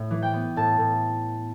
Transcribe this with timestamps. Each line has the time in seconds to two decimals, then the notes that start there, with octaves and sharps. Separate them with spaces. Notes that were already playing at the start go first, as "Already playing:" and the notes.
Already playing: A2
0.11 E3
0.22 G5
0.33 B3
0.56 A2 A5
0.79 A2